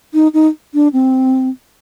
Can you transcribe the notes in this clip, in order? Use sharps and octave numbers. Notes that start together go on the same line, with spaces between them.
D#4
D#4
D4
C4